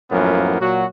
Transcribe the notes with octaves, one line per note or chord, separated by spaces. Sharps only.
F#2 A2 F3 A#3 B3
A#2 F#3 F#4